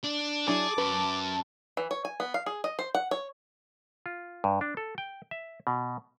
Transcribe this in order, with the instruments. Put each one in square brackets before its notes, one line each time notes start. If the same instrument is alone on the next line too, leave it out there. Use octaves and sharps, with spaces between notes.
[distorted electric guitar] D4
[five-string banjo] F#3 D4 E4 [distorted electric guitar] G#4 [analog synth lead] A5 [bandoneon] D6
[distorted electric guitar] F#2 [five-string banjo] B4
[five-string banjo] E3
C#5
G#5
B3
F5
G#4
D#5
C5
F#5
C#5
[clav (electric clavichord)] F4
G2
D4
A4
G5
E5
B2